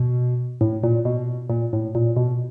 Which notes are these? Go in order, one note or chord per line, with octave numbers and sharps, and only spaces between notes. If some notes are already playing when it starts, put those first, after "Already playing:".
Already playing: B2
A2
A#2
B2
A#2
A2
A#2
B2